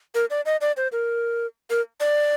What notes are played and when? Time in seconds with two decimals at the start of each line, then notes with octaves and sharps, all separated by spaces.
0.15 A#4
0.30 D5
0.46 D#5
0.61 D5
0.77 C5
0.92 A#4
1.70 A#4
2.00 D5